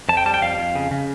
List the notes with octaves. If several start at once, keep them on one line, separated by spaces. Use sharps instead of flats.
F2 A5
G5
G3 A5
G5
F2 F5
F2
C#3
C#3